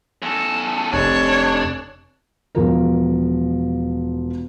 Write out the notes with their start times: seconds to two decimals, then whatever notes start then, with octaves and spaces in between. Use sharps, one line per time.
0.22 E2 A4
0.93 F1 D4 C#5
2.55 E1 F3 A#4